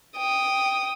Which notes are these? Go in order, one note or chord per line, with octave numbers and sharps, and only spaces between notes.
G5 D#6